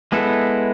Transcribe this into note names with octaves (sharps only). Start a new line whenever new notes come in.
G#3 B3 E4 A4